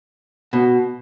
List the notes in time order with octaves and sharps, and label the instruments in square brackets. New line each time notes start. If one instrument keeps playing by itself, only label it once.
[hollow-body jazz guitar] B2